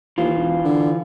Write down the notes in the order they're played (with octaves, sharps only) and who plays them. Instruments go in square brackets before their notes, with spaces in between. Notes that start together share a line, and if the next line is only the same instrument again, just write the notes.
[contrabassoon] D#2 [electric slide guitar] E3 F4
[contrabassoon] E1
D3